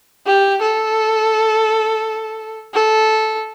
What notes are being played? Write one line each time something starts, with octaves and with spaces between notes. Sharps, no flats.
G4
A4
A4